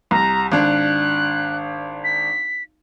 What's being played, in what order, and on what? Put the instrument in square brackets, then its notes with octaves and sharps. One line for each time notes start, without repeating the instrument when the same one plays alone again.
[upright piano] C2 [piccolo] A#5
[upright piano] G#1 D4 [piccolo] F#6
[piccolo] B6